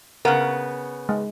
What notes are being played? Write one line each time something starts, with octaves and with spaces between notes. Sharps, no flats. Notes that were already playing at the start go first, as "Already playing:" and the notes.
C#3 B3 A#4 F5 F#5
G#3